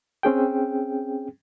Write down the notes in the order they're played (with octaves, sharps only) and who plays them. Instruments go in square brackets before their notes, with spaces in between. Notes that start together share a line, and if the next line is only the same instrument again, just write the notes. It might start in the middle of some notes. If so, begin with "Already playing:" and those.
[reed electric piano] C4 C#4 G#4 G5